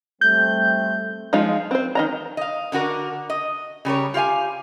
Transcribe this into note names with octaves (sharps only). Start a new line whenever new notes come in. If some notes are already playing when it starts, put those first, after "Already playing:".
G3 A3 C4 G6
F3 G#3 D#4 F4
C4 C5
D#3 D#5 A#5
D#5 F5
D3 D4 F#4 A#4
D#5
C#3 G3 A#4 C#5
F4 G4 F5 G#5